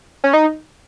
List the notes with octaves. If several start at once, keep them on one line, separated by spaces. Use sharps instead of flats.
C#4
D#4